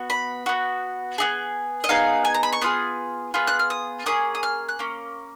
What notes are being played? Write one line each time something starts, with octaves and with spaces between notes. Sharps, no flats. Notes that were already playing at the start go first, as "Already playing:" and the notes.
Already playing: B3 F#4
B5
B3 F#4
B3 D#4 G#4
D#5
B3 D#4 G#4 F5
G#5
A#5
B5
C#6
B3 F4 G#4 D#6
B3 F4 G#4
F#6
F6
D#6
A#3 C#4 G#4 D#6
D#6
F6
F#6
A#3 C#4